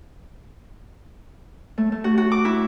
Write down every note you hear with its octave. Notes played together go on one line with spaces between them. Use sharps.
A3
A3
F#4
F#4
D6
E4